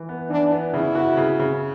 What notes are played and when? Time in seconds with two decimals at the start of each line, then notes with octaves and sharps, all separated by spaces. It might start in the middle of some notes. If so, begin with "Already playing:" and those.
Already playing: E3
0.09 B3
0.30 E3 D4
0.52 B3
0.74 C#3 E4
0.95 F#4
1.17 C#3
1.39 C#3